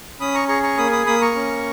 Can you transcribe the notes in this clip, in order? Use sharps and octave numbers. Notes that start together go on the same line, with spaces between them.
C#4 B5 D#6
A#5 C#6
G#4 A#5 C#6
A#5 C#6
A#3 B5 D#6
B5 D#6
A#3 B5 D#6
A#5 C#6
C#4